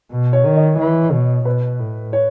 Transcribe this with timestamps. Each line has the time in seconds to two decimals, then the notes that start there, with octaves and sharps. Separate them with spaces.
0.11 B2
0.33 C#5
0.45 D#3
0.57 D#5
0.79 E3
1.12 B2
1.45 B2 B4
1.79 A2
2.13 C#5